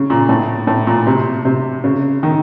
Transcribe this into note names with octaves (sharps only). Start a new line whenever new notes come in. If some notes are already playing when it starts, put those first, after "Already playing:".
Already playing: C#3
A#2
A2
A2
A#2
C3
C3
C#3
D#3